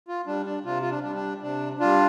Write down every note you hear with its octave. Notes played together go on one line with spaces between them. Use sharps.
F4
G3 D4
D4
C3 F4
F4
D4
G3 D4
D4
C3 D4
G3 D4 F4